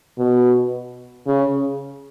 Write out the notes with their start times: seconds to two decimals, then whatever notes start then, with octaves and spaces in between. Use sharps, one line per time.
0.18 B2
1.27 C#3